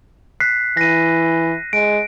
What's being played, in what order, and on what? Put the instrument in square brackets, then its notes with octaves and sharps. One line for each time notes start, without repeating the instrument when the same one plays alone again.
[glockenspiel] F#6 B6 C7
[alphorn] E3 [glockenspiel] A#6 D#7
[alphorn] G#3 [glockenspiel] D7